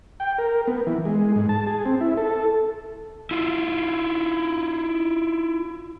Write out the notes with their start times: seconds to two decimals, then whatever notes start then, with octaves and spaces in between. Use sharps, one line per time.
0.20 G5
0.38 A#4
0.67 B3
0.87 E3
1.05 G#3
1.36 G#2
1.49 A5
1.67 G#4
1.86 C4
2.01 E4
2.17 A4
3.31 E4 F4